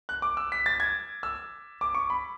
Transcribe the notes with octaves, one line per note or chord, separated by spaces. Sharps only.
F#6
D6
E6
B6
A6
G#6
E6
D6
C#6
B5